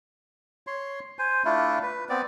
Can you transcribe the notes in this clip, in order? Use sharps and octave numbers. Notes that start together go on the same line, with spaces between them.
C#5 C6
C5 G#5
A3 D4 E4 F4
B4
B3 C4 D5